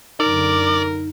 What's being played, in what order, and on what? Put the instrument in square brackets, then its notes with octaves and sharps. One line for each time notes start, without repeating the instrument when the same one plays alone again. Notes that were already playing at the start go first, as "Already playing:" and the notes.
[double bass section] F#2 D3 [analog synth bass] D#4 [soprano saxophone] A#4 [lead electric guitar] D5